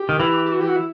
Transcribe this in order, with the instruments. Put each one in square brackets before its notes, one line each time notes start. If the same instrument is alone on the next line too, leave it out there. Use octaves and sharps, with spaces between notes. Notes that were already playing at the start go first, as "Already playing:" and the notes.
Already playing: [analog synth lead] G4
[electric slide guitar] D#3
E3
[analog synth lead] G4
F#4
G4
F#4
E4